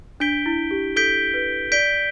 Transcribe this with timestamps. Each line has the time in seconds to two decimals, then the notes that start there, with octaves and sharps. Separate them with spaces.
0.20 D4 G6 B6 D7 G7
0.46 E4
0.71 G4
0.96 A4 G6 B6 D7 G7
1.34 B4
1.72 D5 G6 B6 D7 G7